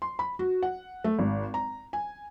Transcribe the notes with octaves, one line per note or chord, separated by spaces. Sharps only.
C6
B5
F#4
F#5
A3
G#1
A#5
G#5